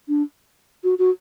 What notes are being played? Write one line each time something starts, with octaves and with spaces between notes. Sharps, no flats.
D4
F#4
F#4